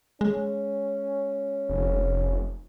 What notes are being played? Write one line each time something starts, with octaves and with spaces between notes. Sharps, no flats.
G#3 C#4
F1